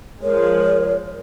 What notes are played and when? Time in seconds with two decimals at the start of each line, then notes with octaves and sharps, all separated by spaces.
0.23 F3 G#3 A#4 C#5